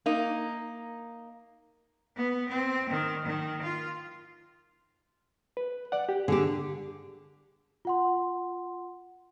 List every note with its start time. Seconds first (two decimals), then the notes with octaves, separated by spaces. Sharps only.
0.06 A#3 D#4
2.16 B3
2.49 C4
2.89 D#3
3.25 D#3
3.62 F4
5.57 B4
5.92 D5 F#5
6.09 G4
6.28 D3 G4 G#4
7.85 F4 F#5 C6